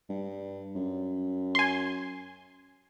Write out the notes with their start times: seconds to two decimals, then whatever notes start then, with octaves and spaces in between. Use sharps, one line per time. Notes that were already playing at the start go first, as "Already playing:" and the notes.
0.09 G2
0.75 F#2
1.55 G#5 C6